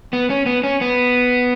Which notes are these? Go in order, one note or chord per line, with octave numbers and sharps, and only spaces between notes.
B3
C#4
B3
C#4
B3